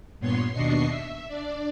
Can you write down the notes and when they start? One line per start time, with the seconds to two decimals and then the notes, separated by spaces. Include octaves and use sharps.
0.19 G2 A#2 B3 C#5 C6 C7
0.52 D#2 B2 D4 D#5 C#6 C7
0.88 E5
1.28 D4 D5